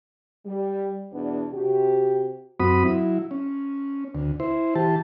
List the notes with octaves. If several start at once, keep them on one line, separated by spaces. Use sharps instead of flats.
G3
E2 B2 B3 D4
C3 F#4 G4
F#2 C4 F#4 B5 D#6
F#3 E4
C#4
D2
E4 C5
E3 G4 A5